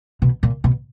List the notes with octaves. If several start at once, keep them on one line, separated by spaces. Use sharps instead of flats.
B2
A#2
B2